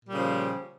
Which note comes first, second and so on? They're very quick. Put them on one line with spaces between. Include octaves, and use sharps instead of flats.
A#2 G3 C#3 F3